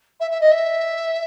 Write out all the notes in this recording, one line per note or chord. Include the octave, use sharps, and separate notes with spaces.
E5
E5
D#5
E5